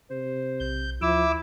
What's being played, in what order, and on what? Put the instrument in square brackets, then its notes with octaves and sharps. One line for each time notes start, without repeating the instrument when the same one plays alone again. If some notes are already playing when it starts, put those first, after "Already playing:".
[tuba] C3 [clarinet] C5
[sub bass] B1 [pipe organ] G6
[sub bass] D2 [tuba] F3 [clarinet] E4 [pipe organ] E5 D6 E6